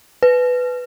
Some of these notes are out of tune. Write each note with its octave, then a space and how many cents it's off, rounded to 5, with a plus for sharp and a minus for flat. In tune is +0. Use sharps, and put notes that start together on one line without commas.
B4 +10